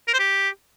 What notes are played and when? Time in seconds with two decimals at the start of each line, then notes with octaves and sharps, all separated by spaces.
0.08 A#4
0.13 C5
0.19 G4